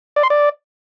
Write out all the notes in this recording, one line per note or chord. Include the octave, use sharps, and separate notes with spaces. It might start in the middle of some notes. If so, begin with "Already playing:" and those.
D5
C6
D5